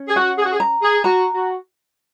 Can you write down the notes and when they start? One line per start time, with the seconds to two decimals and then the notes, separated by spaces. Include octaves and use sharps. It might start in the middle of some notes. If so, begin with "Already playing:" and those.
Already playing: C#4
0.08 G#4
0.16 F#4 F#5
0.37 G#4
0.45 F#4
0.52 G#4
0.60 A#5
0.82 G#4
1.04 F#4 A#5
1.34 F#4